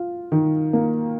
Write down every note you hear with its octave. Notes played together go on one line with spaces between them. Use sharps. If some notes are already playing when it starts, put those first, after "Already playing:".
Already playing: F4
D#3
A#3